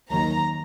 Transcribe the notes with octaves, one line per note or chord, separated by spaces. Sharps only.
D#2 D#3 F#3 A#5